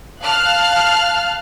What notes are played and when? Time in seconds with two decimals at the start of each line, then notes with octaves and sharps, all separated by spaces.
0.23 F5 A5 F6 F#6